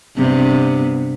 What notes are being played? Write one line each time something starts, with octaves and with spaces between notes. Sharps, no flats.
G2 C3 B3